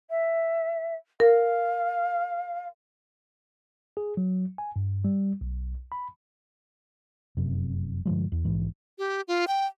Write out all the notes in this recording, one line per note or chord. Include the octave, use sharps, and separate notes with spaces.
E5
A#4 F5
G#4
F#3
G#5
G2
G3
B1
B5
F1 F#2 C3
G2 D3 F3 G#3
E2
A#1 G#2 E3
G4
F4
G5